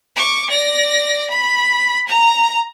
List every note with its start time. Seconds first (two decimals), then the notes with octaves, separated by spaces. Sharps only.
0.16 C#6 D6
0.49 D5 A#6
1.30 B5
2.07 A#5